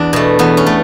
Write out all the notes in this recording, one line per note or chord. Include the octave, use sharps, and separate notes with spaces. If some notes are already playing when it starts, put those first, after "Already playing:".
Already playing: E2 D4
B2 A3
E2 B3
C#4
A3